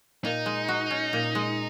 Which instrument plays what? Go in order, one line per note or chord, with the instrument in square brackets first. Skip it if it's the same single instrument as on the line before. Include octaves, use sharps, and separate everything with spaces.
[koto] A#2 [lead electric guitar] D#4
[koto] G#3
F#4
C#4
A#2
G#3